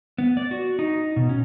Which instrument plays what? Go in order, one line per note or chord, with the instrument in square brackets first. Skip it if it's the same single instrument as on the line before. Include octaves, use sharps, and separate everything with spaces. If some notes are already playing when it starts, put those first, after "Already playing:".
[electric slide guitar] B3
D5
F#4
D#4
B2
C#4